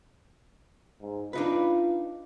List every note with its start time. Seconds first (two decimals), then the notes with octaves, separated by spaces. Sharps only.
1.01 G#2
1.33 D4 D#4 F4 B4